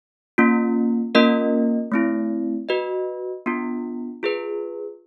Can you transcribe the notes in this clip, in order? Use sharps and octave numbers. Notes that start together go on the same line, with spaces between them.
A#3 C#4 F4
A#3 C#4 F4 A#4 D#5
A3 C4 E4
F#4 B4 D#5
B3 D4 F4
F4 G#4 B4